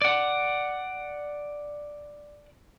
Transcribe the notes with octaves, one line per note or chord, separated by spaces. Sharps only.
D5 F#5